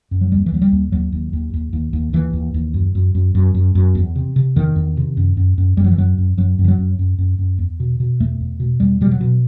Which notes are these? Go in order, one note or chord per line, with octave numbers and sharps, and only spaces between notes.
F#2
F#3
D#2 G3
E3
D#2 F#3
G3
D#2
D#2 F#3
D#2
D#2
D#2
D#2
D#2
D#2 E3
D#2
D#2
F#2
F#2
F#2
F#2
F#2
F#2
E2
C3
C3
E2 D#3
E2
C3
F#2
F#2
F#2
F#2 G3
F#3
E3
F#2 F#3
F#2
F#2 F#3
F#2
E3
F#3
F#2
F#2
F#2
F#2
E2
B2
B2
E2 A3
E2
B2
E2 G3
B2 G3
F#3
B2